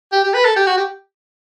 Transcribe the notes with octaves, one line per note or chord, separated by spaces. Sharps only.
G4
G4
B4
A4
G4
F#4
G4